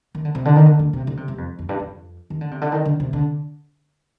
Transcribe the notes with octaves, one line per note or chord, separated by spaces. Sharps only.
D#3
D3
C3
D3
D#3
D3
D3
C3
D3
C3
G2
F2
F2
G2
F2
D#3
D3
C3
D3
D#3
D3
C3
D3